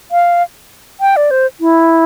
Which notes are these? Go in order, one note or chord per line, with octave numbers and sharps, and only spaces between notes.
F5
G5
D5
C5
E4